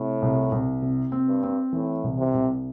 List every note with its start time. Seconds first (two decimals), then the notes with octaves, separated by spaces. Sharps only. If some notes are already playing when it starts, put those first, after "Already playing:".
Already playing: A2 C3
0.22 C2
0.52 C2
0.82 C3
1.12 C4
1.28 G2
1.43 C4
1.73 A2 E3
2.04 C2
2.18 C3
2.34 C2